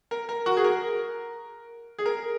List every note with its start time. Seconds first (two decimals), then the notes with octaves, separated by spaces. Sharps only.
0.11 A#4
0.29 A#4
0.46 F#4
0.57 G#4
0.64 A#4
1.99 G#4
2.06 A#4